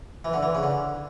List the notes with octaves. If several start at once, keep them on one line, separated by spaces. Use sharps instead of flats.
E3
D3
E3
C#3
D3